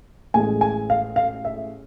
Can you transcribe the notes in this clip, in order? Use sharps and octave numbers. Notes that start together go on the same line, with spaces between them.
A1 A2 G#3 G#5
G#5
F5
F5
E5